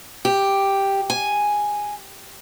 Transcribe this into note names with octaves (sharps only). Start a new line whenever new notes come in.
G4
G#5